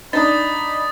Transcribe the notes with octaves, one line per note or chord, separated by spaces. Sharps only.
D4 D#4 B5 D#6 A6